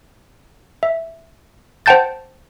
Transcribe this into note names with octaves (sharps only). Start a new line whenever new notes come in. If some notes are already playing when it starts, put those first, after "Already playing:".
E5
C5 F#5 G5 A5 G6 A6